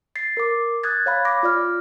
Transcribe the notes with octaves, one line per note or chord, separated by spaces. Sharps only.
A6 C7
A#4 D6
D#6 F#6 G#6 A6
C#5 F5 B5
D6 A#6
F4 D5 F6